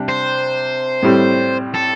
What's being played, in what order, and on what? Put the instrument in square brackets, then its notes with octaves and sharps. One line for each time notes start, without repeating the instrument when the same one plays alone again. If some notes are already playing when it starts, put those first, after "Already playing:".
Already playing: [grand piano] C3 G3 D4
[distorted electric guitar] C5
[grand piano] A2 G3 C4
[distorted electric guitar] A4